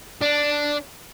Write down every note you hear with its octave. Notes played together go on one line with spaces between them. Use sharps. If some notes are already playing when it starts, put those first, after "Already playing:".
D4